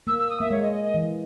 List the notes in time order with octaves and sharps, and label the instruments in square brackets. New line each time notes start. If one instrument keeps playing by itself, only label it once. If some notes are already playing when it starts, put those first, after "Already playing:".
[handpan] A#3 [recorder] E6
[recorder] E6
D#6
[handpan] A#3 [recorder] E5
[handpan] G#3 [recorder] C#5
[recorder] D#5
D#5
D#5
[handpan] E3